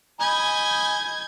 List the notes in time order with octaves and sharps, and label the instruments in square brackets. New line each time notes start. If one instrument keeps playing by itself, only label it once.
[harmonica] D#5 G#5 B5 [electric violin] G6 G#6